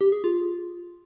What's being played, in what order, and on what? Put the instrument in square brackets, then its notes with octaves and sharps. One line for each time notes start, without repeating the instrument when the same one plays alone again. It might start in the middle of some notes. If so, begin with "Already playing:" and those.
[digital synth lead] G4
G#4
F4